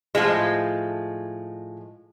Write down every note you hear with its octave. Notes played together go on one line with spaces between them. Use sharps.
A2 F3 G#3